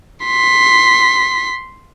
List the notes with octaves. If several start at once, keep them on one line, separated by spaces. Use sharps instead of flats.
C6 B6